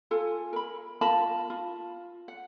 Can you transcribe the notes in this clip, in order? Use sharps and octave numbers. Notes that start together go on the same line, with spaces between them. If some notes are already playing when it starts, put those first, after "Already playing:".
F4 A4 G#5
A#4 B5
F4 A#4 A5 B5
F4
F#5